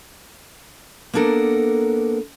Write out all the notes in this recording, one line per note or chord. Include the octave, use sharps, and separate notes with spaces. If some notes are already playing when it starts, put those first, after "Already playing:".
A#3 B3 D4 A4 A#4